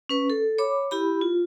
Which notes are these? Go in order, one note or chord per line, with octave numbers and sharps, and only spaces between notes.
C#4 B4
A4
C#5 B5 D6
E4 G4 B5
F4